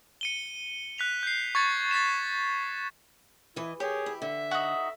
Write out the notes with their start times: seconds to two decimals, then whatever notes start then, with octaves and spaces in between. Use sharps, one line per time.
0.21 C#7 D#7 G7
0.98 F#6 B6 F7
1.23 G6 C7
1.55 C#6 G#6 A6 C#7
1.91 A6 B6 C7 E7
3.56 E3 E4 D#5
3.80 G4 G#4 A#4 C#5
4.06 E4
4.22 D3 E5
4.51 D#4 F#4